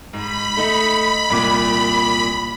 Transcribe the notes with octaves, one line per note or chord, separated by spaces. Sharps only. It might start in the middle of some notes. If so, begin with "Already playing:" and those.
G#2 B5
A3 D#4
C2 A#2 D6